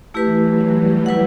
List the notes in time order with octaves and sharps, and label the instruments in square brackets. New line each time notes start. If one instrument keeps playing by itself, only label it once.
[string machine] E3 [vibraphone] A3 E4 G4 B4
[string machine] F#3
G3
[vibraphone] E4 B4 F#5